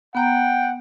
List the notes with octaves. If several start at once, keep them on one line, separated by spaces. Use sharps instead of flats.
B3 F#5 G5 A#5